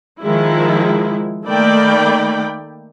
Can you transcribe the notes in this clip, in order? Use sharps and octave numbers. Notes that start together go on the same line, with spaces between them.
D#3 F3 G#3 E4
D#3 A3 A#3 D5 G5 B5